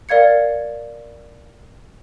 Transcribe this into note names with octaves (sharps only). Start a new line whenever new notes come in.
A#4 D5 F5 G#6 C#7